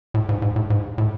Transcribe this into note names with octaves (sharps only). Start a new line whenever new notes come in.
A2
G#2
G#2
A2
G#2
A2